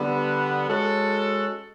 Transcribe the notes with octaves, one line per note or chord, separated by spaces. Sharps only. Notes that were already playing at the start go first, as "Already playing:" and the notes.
Already playing: D3 G3 B3
G#3 C#4 F#4 A4